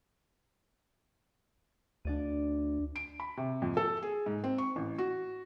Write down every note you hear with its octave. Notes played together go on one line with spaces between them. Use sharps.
D2 D4 D5 D#7
D7
B5
C3
F2
A4
G#4
G#2
C4
C#6
A1
F#4